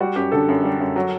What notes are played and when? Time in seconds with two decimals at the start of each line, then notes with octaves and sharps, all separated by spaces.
0.01 G3 F#4
0.16 F#2 G4
0.32 D3 A4
0.49 F#2
0.64 G3
0.80 F#2
0.96 F#3